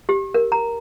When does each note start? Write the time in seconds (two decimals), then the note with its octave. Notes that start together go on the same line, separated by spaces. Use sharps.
0.09 G4
0.34 A#4
0.52 A#5